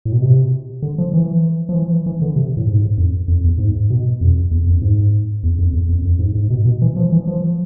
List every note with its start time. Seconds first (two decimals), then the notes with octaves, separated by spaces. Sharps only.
0.05 A2
0.13 B2
0.21 C3
0.82 D3
0.98 F3
1.14 E3
1.69 F3
1.74 E3
2.06 E3
2.22 D3
2.36 C3
2.57 A2
2.67 G#2
2.98 F2
3.28 F2
3.44 E2
3.58 G#2
3.90 B2
4.21 F2
4.51 E2
4.67 F2
4.82 G#2
5.43 E2
5.59 F2
5.73 E2
5.89 F2
6.05 F2
6.19 G#2
6.35 G#2
6.50 B2
6.65 B2
6.82 E3
6.96 F3
7.12 E3
7.27 F3